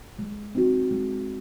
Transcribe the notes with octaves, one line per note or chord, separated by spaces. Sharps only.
G#3
C4 D#4 F#4
G#3